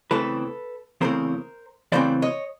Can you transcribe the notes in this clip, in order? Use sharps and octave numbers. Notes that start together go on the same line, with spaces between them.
E2 C#3 E3 A3 C4 A4 B4
E2 C#3 E3 A3 C4 A#4 C5
E2 C#3 E3 A3 C4 C5 D5
C#5 D#5